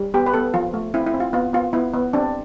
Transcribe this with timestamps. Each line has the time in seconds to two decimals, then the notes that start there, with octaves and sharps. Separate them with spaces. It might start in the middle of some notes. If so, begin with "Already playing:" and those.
Already playing: G3
0.14 B3 G4
0.26 B4
0.34 B3 A4
0.54 F3 F4
0.74 A3
0.94 C4 E4
1.06 E4
1.14 C4
1.20 F4
1.33 B3 F4
1.53 B3 F4
1.73 B3 E4
1.94 B3
2.13 C4 D4